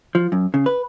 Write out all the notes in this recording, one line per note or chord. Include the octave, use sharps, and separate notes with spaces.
F3
F#2
C#3
B4